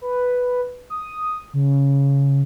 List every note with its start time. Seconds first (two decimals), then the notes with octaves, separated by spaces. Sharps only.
0.01 B4
0.90 D#6
1.54 C#3